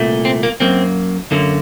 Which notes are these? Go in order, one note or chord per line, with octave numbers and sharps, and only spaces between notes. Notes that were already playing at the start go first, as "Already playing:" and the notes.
Already playing: C2 A#2 A3
C4
A#3
F#2 F#3 A#3 C4
F#2 D3 F#3 A#3